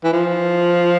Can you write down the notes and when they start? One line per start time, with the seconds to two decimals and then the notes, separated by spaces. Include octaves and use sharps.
0.04 E3
0.13 F3